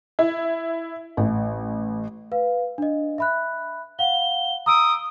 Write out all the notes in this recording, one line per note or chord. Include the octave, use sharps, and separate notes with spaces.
E4
A1
B4 F5
D4 D#5
E5 B5 F#6
F5 F#5 G7
A#5 D#6 E6 D7